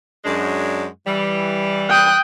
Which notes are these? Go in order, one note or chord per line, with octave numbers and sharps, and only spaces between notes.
F#2 G#3 D4
E3 G3
G5 D#6 F#6